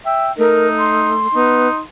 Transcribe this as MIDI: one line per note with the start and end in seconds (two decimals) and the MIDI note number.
0.05 0.29 76
0.05 0.32 79
0.38 1.27 57
0.38 1.12 63
0.38 0.69 70
0.78 1.78 84
1.34 1.68 59
1.34 1.81 63